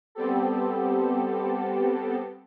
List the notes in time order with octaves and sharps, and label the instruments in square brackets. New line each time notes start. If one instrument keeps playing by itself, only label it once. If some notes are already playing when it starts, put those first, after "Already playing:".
[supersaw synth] G3 B3 C4 G4 A4